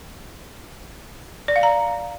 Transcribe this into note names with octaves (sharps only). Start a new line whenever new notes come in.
D5
F5
A#5